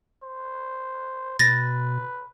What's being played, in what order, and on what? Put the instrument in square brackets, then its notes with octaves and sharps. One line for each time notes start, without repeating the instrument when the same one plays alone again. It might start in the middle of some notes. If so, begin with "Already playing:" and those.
[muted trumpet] C5
[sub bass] B2 [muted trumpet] B4 [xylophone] A6 A#6